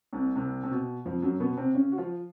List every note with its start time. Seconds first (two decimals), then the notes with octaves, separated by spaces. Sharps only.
0.13 C2 C3
0.36 C2 C3
0.64 C3
0.71 B2
1.05 F2 F3
1.22 F#2 F#3
1.40 B2 B3
1.57 C3 C4
1.75 C#3 C#4
1.92 F#4
1.98 F3 F4